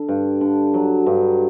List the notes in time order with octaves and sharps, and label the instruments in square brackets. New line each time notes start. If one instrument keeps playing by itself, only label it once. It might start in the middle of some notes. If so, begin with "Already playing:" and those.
Already playing: [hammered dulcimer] D3
G2
D3
F#3
G2